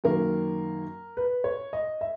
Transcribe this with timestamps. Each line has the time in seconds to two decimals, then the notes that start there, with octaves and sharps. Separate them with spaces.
0.04 F#2 D#3 A#3 A#4
1.17 B4
1.44 C#5
1.73 D#5
2.01 E5